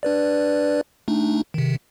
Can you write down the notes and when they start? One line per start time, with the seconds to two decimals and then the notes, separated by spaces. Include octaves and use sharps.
0.03 D4 B4 D5
1.08 A3 D4 D#4
1.54 C3 D#3